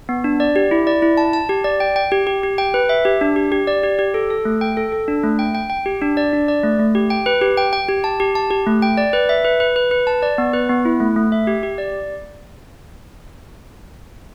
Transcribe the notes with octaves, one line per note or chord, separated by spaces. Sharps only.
B3
D4
D5
G4
E4
D5
E4
A5
A5
G4
D5
G5
G5
G4
G4
G4
G5
B4
E5
G4
D4
G4
G4
D5
G4
G4
A4
A4
A3
G5
A4
A4
D4
A3
G5
G5
G5
G4
D4
D5
D4
D5
A3
A3
G4
G5
B4
G4
G5
G5
G4
A5
G4
A5
G4
A3
G5
D5
B4
E5
B4
B4
B4
B4
A5
D5
B3
B4
B3
E4
A3
A3
E5
G4
G4
D5